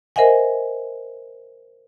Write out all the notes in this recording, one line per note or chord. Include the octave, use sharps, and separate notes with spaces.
A#4 C5 D#5 E5 F#5 G#5